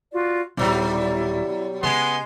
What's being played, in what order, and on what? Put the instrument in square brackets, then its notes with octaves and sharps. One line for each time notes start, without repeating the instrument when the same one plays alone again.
[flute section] F4 F#4 D5
[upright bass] D#1 [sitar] B2 F#3 G3 [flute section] E4 D5
[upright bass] C#3 [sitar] G#3 [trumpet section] B3 G#5 C6